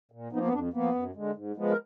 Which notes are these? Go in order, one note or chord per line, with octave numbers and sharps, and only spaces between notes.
A#2
F3 A#3 B3 D#4
B3
F2 D4
F3 A#3 B3
F#2
D3 G#3
G#2
F3 G#3 B3
A#4